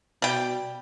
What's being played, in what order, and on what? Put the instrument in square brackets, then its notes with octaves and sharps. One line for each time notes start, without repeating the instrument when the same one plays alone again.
[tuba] B2 [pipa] G3 G5